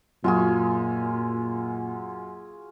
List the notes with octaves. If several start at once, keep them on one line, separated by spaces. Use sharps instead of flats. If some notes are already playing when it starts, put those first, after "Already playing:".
F#2 A#2 F4 F#4 G#4